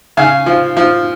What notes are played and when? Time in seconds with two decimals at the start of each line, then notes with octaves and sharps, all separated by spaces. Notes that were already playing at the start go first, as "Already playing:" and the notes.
0.17 C#3 F5 G#5
0.46 F3
0.77 F3